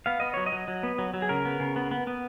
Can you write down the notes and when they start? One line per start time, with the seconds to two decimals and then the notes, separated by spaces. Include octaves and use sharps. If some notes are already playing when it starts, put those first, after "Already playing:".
0.06 B3 F5
0.20 B3 D#5
0.34 F#3 C#5
0.46 D#5
0.52 F#3
0.68 F#3
0.83 B3
0.98 F#3
1.14 F#3
1.22 G#4
1.29 C#3 A#4
1.45 B3
1.60 C#3
1.76 B3
1.91 B3
2.07 B3